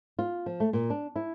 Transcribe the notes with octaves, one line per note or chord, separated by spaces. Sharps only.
F4
F3
A3
A#2
D4
E4